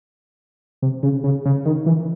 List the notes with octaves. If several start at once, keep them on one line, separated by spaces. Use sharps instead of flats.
C3
C#3
C#3
C#3
D#3
E3